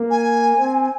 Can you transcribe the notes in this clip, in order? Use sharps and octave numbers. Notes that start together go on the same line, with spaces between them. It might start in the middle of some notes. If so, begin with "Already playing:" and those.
Already playing: A#3
G#5
C4